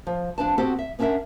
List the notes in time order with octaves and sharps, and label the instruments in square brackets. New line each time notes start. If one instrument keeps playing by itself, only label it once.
[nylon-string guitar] F3
F2 D4 B4 A5
B3 C4 F#4 G4 A4 C5
E5
B3 C#4 D4 A#4 E5 F#5